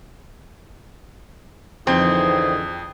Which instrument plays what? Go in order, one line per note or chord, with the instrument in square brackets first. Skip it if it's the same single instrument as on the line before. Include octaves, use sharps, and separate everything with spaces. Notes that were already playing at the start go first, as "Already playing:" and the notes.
[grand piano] F2 [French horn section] D3 E3 D#4 [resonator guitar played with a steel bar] C4 [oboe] G#4